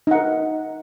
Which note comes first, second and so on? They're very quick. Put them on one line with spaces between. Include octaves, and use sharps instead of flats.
D#4 F#5 A#4